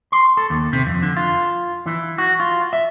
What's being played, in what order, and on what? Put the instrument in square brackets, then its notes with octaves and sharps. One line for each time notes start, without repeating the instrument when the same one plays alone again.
[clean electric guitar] C6
A4
D#2
C3
F2
D3
F4
E3
F#4
F4
E5